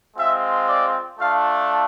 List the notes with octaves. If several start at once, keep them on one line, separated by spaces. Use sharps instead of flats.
G#3 C4 F4 E5
D5
A3 D4 F4 F5